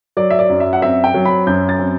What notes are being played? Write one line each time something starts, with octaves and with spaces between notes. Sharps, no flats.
F#3 D5
E5
D5
F#2
E5
F#5
C4 E5
G5
F#3
B5
F#2 G6
A6
C4